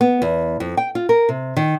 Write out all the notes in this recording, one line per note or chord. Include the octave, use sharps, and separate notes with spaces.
B3
E2
F2
G5
F4
A#4
C3
D#3